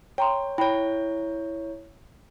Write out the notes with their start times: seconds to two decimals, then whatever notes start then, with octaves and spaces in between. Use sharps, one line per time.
0.18 C#5 G5 A#5 C6
0.58 E4 C#5 G5 B5